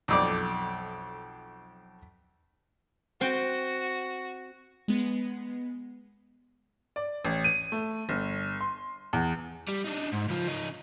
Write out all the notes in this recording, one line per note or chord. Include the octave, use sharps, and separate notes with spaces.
B1 F2 D5
C4 F#4 G5
G#3 B3
D5
A1
D#7
A3
G1
C6
E2
G3
D4 D#4
G#2
C#2 F3
C#3 D#4